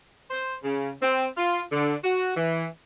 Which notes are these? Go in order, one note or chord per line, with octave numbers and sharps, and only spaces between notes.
C5
C#3
C4
F4
D3
F#4
E3